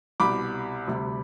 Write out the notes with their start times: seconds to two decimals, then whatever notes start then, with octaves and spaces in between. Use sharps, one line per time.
0.20 C2 B2 G3 B5 D6
0.87 D2 C3 G3